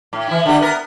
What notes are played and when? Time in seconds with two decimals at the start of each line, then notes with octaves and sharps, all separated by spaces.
0.13 A2
0.27 E3 E4
0.46 D3 G4
0.60 B3 A#4